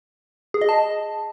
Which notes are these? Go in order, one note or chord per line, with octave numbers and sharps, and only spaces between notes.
G#4
D#5
A5